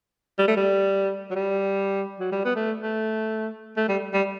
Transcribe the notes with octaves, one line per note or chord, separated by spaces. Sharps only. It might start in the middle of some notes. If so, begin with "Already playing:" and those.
G3
A3
G3
F#3
G3
F#3
G3
B3
A3
A3
A3
G3
G3